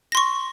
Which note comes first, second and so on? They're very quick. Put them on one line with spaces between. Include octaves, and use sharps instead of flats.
A#6 C6 C#6